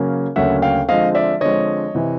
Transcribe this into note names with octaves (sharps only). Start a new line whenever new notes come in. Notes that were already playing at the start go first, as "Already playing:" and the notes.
Already playing: C#3 F#3 A#3 C#4
D2 C#3 F#3 A#3 C#4 E5 F#5
F5 G5
D3 F3 G#3 C4 D#5 F5
D5 E5
D3 F3 G#3 C4 C#5 D#5
C3 E3